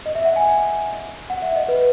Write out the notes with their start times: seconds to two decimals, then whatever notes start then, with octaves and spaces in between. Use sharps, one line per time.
0.06 D#5
0.15 E5
0.25 F#5
0.36 G#5
1.30 F#5
1.42 E5
1.56 D#5
1.68 B4